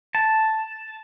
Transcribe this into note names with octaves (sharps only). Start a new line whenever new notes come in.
A5